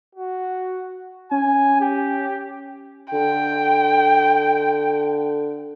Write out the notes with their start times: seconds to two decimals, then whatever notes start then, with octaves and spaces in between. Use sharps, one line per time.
0.15 F#4
1.31 C#4 G#5
1.81 G4
3.12 D3 G5